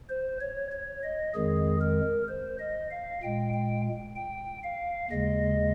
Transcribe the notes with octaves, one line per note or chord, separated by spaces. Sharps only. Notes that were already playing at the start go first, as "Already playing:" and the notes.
C5
C#5
C#5
D#5
F2 D#3 G#3 G#4
A#4
C5
D#5
F5
A#2 G#3 G5
G5
G5
F5
D#2 C#3 G#3 D#5